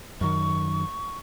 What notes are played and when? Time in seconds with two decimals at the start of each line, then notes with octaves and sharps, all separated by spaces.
0.21 F#2 D#3 C#6